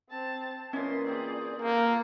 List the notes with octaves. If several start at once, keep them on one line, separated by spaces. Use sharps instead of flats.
C4 A5
A#2 E3 C#4 C#5 D#5 C6
C4 G#4 C5 D5 D#5
A#3 F4 A4 C5